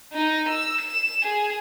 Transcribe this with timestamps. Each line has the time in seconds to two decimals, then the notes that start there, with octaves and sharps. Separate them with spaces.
0.13 D#4
0.48 E6
0.81 E7
1.23 G#4